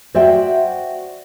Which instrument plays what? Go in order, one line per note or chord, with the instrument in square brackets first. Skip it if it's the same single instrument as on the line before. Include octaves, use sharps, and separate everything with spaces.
[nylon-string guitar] F#4 C5 D5 E5 F#5 G5